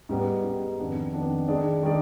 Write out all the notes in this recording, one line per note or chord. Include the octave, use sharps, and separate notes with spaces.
G#2 G3 B3
G#2 G3 B3
F2 D#3 B3 D4
F2 D#3 B3 D4
D#3 G#3 D4 G#4 D5
D#3 G#3 D4 G#4 D5